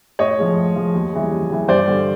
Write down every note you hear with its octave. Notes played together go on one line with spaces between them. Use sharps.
A2 C#5 D#5
F3 G#3
A2
F3 G#3
D#2
C#3 E3 G3
D#2
C#3 E3 G3
G2 C5 D5
D3 G3